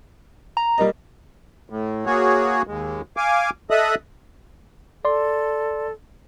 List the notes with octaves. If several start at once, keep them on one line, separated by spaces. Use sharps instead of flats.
A#5
G3 A#3 D#5
A2
A#3 F#4 G#4 C#5
D#2 G#3
F5 G#5 D6
A4 D#5 E5 D#6 F#6
A4 D5 C6